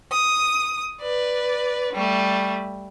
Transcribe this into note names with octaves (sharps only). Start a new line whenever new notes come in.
D#6
B4 D5
G3 A3